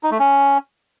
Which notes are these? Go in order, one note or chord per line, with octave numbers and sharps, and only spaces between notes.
D#4
A3
C#4